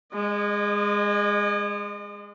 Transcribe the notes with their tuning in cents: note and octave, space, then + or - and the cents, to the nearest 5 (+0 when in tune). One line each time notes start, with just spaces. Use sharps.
G#3 -15 D#5 -45